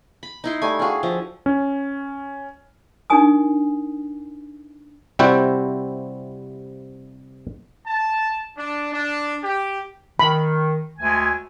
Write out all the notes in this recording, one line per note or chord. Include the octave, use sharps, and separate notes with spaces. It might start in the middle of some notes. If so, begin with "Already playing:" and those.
B5
D#4 E4 C6
G3 A3 G#5
D4 F#4 G#4 F5 G#5
F3 E5
C#4
D4 D#4 G4 A#4 G#5 D#6
C3 G3 C4 E4 F#4 G5
A5
D4
D4
G4
D#3 B5
D2 G#3 G#5